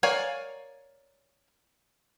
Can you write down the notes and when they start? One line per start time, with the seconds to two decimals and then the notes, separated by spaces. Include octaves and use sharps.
0.03 A#4 C#5 D5 F5 G#5